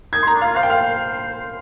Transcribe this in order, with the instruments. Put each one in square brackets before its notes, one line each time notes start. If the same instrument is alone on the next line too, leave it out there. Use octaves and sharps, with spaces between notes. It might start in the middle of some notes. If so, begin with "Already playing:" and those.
[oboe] D#4 [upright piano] G#6
[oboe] D#4 [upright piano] A#5 C6
[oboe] D4
[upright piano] F5
[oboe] F4
[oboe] C5 [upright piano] F5
[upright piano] G5
F5